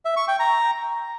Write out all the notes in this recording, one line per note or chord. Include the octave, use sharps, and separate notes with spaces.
E5
C#6
G5
A#5